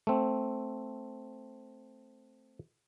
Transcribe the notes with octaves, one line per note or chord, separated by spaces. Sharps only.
A3 C4